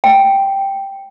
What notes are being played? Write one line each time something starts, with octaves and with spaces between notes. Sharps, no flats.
G5